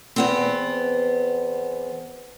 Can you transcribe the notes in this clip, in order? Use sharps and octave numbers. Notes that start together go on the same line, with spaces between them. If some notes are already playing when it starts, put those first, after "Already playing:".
E2 B3 C4